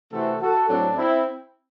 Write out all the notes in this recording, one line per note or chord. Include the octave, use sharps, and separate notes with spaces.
C3 E3 A3 C4 F#4 A4
F#4 A4
A2 F#3 C4 D4
C4 E4